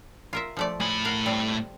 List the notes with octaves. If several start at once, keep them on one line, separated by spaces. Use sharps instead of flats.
F4 A#4 E5
F3 A3 D5
A2 G#4 B5
A#4 F5 F#5
G3 C4 A4